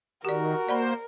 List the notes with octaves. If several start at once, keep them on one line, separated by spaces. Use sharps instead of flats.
D#3 F#4 G4 A#4 D5
A#3 C5 D5 F#5 B5